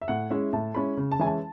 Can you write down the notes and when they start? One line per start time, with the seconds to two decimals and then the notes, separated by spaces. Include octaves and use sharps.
0.01 E5
0.08 A2 F#5
0.30 G#3 C#4 E4 E5
0.53 A2 A5
0.75 G#3 C#4 E4 B5
0.97 C#3
1.11 A5
1.19 E3 G#3 C#4 E4 G#5
1.26 A5